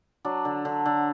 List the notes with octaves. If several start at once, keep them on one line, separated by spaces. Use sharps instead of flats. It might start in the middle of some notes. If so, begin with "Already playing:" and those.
F#3 D4
D3
D3
D3